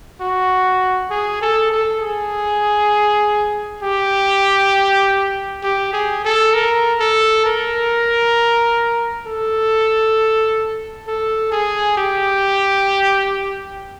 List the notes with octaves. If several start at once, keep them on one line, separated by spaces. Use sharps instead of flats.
F#4
G#4
A4
A4
G#4
G4
G4
G#4
A4
A#4
A4
A#4
A4
A4
G#4
G4